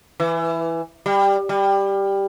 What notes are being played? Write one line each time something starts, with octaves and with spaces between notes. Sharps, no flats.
E3
G3
G3